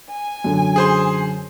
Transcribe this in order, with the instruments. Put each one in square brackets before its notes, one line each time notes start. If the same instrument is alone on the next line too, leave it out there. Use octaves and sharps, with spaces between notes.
[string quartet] G#5
[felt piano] F#2 D3
[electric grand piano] G#4 C5 C6